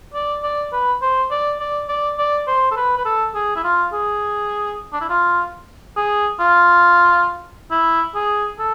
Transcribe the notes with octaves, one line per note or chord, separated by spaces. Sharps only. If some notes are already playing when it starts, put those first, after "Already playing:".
D5
D5
B4
C5
D5
D5
D5
D5
C5
A4
B4
B4
A4
G#4
E4
F4
G#4
D4
E4
F4
G#4
F4
E4
G#4
A4